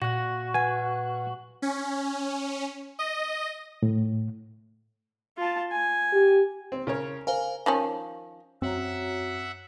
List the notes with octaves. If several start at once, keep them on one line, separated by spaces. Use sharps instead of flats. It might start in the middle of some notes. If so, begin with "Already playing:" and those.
A#2 F#4 F#6 A#6
B4 F#5 G#5
C#4
D#5
A2
F4 A5
G#5
G4
C4
C#3 A#4 C#5
A#4 C5 F5 G#5
D#3 F3 C#4
F#2 C4 F#4 C#5 E5 F#5 A#5